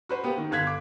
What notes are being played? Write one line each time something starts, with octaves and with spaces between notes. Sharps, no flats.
F#4 B4 C5
A#3 B3 G4
D#3
G1 F5 F#6 G#6 B6
D6